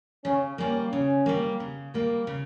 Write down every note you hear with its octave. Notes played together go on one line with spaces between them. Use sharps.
C#3 C#4
G3 A#3 C#4
C#3 C#4
G3 A#3
C#3
G3 A#3
C#3